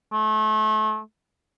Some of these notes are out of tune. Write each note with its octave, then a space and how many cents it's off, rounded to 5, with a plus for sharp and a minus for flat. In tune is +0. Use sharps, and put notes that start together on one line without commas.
A3 -30